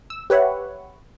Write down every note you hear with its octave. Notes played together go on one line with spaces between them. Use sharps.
E6
G4 B4 C#5 E5 F#5